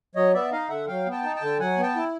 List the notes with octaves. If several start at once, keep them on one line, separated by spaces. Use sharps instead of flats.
F#3 C#5 D#5
B3 D5 E5
D#4 D#5 F5
D3 E5 F#5
F#3 F5 G5
B3
G5 A5
D#4
G5 A5
D3
F#3 F#5 G#5
B3 G5 A5
E4